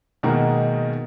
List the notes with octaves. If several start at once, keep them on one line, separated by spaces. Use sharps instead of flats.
B2 D#3 G#3 A#3 D#4 F#4